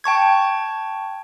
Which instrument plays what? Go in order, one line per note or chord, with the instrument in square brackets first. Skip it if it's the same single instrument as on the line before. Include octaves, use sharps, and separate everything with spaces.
[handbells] G5 A5 C#6 G#6